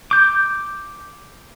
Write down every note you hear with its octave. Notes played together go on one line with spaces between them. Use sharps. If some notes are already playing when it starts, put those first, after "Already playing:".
D6 G6